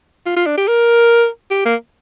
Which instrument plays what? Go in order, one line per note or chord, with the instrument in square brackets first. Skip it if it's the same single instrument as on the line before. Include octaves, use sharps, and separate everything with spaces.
[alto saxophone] F4
F4
D4
G4
A#4
G4
A#3